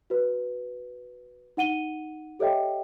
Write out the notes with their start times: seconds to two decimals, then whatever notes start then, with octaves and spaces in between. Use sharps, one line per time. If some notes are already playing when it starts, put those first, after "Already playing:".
0.10 F#4 B4
1.57 D#4 F#5 D#7 G7
2.39 G4 A4 C#5 D#5 E5 G5